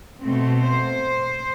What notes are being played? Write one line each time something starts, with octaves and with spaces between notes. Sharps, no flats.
B2 A3 C4
C5